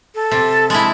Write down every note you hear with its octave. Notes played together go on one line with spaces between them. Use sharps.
A4
C3
G#3 E4 A5